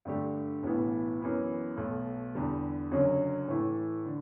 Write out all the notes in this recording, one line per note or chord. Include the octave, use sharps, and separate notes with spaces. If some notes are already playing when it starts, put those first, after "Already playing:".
G2 D3 A3 D4 G4
B1 A2 E3 B3
F#2 E3 B3
B1 B2 A3
E2 D3 G3
F#1 F#2 D3 F#3 C#4
A2 E3 A3
D3